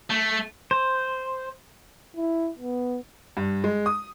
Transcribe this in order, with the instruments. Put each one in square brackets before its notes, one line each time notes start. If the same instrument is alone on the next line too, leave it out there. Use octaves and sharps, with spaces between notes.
[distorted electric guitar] A3
[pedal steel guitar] C5
[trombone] E4
B3
[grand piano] G2
G#3
D#6